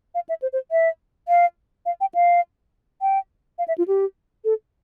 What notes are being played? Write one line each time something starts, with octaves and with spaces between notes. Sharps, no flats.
F5
E5
C5
C5
E5
F5
F5
G5
F5
G5
F5
E5
F4
G4
A4